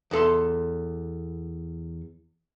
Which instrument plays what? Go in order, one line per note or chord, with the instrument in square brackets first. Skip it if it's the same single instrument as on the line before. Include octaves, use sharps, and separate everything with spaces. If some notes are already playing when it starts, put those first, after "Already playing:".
[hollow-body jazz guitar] E2 A4 C6